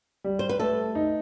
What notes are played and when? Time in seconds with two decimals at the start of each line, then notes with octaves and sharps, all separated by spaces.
0.24 G3
0.39 C5
0.49 B4
0.60 A3 A4
0.95 D#4